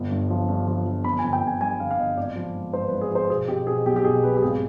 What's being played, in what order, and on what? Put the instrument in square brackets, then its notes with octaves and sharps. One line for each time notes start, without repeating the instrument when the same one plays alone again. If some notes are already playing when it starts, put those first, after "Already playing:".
Already playing: [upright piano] G1
G2
F3
G2
F3
F3
G1 B5
G#5
G1
G5
G1
G#5
G2 G#5
G1 F5
F5
G1 D#5
G#1 D5
F3
G#2
G#2 C5
B4
G#2
G#4
F3 C5
B2 G#4
B2 G4
B2 G#4
B1 G4
G4
B2 G#4
B1 B4
G4
G#1 G#4